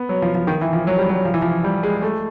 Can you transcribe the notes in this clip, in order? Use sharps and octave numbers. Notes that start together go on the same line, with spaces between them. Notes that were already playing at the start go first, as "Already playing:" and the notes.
Already playing: B3
F#3
F3
F3
D#3
E3
F3
F#3
G3
F#3
F3
E3
F3
G3
G#3
A3